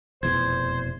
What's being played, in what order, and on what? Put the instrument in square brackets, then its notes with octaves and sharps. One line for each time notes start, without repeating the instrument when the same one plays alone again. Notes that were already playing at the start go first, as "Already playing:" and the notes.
[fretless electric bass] F1 E2 [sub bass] B2 [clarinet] C5 [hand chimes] G#6